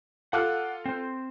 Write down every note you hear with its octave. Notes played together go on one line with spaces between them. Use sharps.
F4 A4 F5 F#5 D6 F#6
C4 C5